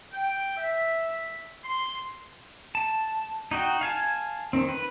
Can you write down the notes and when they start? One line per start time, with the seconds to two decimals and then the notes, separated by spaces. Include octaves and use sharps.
0.12 G5
0.57 E5
1.64 C6
2.75 A5
3.51 D#4 F#4 G5
3.81 F5 G#5 A5
4.53 D#3 C4
4.69 B4